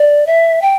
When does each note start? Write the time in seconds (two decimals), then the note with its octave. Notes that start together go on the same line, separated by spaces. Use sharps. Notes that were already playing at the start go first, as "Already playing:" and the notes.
Already playing: D5
0.27 E5
0.62 G5